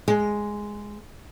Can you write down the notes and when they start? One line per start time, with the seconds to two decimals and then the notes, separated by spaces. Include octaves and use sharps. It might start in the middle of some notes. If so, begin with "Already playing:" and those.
0.08 G#3